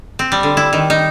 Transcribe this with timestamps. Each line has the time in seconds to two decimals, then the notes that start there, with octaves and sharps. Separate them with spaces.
0.19 C4
0.32 G3
0.43 D3
0.57 E4
0.73 D#3
0.90 D#4